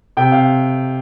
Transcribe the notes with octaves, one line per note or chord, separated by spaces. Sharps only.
C3 G5
F5